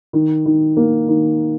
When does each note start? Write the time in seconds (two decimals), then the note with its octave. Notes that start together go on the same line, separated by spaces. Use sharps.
0.13 D#3
0.46 D#3
0.77 A#3
1.08 D#3